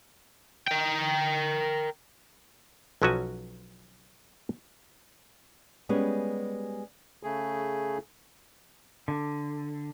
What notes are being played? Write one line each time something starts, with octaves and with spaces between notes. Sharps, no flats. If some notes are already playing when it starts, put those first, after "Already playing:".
A#4 G5
B1 F3 F#3 C#4 F#4 G#5
G3 G#3 B3 C#4 G4 G#4
C#3 A3 G#4
D3